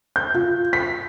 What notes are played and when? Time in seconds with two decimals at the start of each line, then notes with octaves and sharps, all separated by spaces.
0.16 G6
0.34 F4
0.73 B6